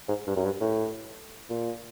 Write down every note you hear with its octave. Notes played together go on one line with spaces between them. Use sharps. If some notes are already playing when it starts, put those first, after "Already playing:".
G#2
G2
F#2
G2
A2
A#2